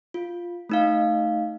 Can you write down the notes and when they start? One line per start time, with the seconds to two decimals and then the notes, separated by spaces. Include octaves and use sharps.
0.14 F4
0.70 A3 D#4 F5